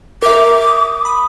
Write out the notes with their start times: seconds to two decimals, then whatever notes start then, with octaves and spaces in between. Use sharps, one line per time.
0.22 A#4 E5 D6
0.67 D#6
1.05 B5 D#6